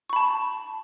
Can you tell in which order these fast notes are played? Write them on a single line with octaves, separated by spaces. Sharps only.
C#6 B5 A5